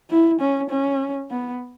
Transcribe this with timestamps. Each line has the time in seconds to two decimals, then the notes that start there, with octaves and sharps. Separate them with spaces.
0.10 E4
0.40 C#4
0.70 C#4
1.30 B3